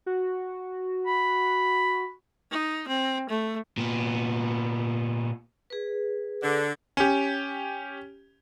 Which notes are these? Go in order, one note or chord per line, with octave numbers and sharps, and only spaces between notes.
F#4
B5
D#4
C4
A3
A#2 B3
G#4 B4
D3
C#4 G4